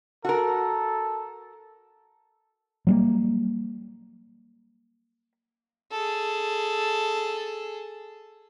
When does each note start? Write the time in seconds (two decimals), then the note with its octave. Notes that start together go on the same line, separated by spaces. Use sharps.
0.25 F#4 A4 A#4
2.87 F#3 G3 A#3
5.92 G#4 A4